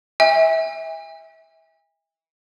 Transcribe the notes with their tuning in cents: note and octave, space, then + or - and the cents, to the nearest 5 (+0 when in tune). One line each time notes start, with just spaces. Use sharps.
E5 -30 G#5 -40